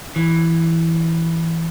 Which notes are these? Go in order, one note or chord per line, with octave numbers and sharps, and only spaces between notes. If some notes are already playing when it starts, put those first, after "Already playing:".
E3